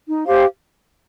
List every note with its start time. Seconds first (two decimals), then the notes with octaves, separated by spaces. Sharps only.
0.08 D#4
0.26 G4 C5 F5